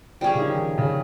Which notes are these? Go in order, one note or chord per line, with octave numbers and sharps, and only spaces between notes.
F3 G3 C#4 G#4
C#3
D#3
C#3